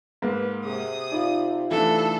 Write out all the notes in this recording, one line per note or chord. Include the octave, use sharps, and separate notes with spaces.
G#2 A#3 B4
C3 G#4 D#6
D#4 F4 D5 F5
E3 A3 D4 A4